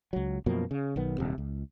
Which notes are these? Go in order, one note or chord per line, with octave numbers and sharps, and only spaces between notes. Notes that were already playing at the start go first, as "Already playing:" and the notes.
C#2 F#3
F#2 B2 F3 A#3
C#3
B1 D#3 B3
D#1 C3
C#2